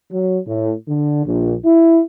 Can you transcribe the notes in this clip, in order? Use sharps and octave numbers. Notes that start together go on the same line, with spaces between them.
F#3
A2
D3
A#1
E4